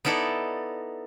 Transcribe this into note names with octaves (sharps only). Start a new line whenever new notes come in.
B3 D#4 E4 A4 D5